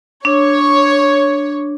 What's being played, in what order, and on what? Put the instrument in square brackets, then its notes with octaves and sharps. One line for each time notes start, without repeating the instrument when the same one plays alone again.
[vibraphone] D4 [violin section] C#5